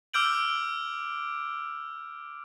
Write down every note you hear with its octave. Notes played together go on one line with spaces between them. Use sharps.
D6 E6 F6 G6 D7 F#7